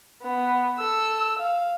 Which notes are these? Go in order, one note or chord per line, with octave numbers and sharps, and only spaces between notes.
B3
A4 E6
F5